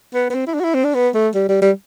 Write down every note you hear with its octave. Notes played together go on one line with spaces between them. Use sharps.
B3
B3
C4
E4
D4
F#4
E4
C4
D4
B3
A3
G3
G3
G3